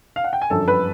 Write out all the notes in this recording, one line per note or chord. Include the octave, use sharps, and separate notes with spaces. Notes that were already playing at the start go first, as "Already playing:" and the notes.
F5
F#5
G5
G#5
G1 F#2 D3 F3 A4 A5
B4 B5